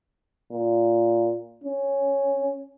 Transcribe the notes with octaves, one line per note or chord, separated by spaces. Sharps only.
A#2
C#4